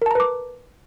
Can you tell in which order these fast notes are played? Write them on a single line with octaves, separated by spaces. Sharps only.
A#4 A5 A#5 B4 D6